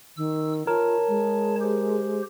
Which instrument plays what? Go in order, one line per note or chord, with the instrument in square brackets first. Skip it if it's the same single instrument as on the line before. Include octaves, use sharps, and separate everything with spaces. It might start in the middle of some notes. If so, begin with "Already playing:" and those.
[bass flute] D#3 [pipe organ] E6
[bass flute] F4 [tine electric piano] A#4 [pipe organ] C#5 A5
[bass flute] G#3
[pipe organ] G4 C5